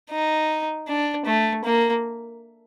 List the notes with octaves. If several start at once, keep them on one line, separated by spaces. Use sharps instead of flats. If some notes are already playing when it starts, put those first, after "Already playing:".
D#4
D4
A3
A#3